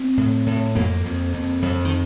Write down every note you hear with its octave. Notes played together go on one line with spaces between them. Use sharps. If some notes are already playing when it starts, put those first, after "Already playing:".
Already playing: C4
A2
A2
F2 A#3
F2
F2
F2
D#3